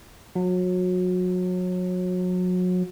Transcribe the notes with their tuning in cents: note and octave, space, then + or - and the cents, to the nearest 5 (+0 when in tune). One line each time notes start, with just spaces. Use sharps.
F#3 -30